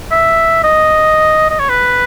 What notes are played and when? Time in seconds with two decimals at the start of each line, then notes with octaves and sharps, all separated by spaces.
0.11 E5
0.64 D#5
1.50 D#5
1.59 C#5
1.69 B4